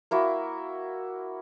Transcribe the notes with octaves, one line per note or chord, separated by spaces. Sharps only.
A#3 E4 F#4